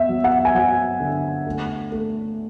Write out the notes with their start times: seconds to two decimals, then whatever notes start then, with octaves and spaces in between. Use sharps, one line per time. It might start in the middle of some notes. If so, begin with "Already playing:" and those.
Already playing: B3 E5
0.09 F#3
0.24 F#5
0.45 G#5
0.55 F#3 F#5
1.00 D3
1.47 A3
1.92 A3